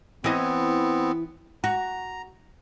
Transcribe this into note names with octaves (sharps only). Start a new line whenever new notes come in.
E3 B3 C4 D#5
F#4 A#5